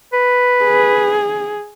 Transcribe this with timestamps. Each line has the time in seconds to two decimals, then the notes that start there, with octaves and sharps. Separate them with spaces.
0.13 B4
0.65 G#4